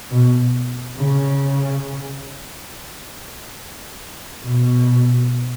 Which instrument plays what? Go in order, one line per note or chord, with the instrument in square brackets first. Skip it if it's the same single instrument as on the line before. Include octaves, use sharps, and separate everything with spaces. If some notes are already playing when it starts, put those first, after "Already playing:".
[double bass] B2
C#3
B2